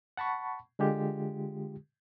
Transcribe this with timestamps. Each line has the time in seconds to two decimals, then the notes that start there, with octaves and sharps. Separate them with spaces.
0.17 F#5 A5 B5 C#6
0.79 D3 G#3 F4 G4